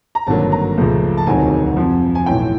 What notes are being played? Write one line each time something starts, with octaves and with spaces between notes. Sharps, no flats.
A#5
G#1 G2 D3 F#3 A#3 A5
A#5
C#2 C#3 F3 A3
A5
E1 D2 C3 D#3 F#3 G#5
F2 C3 F3
G#5
B1 A2 E3 G5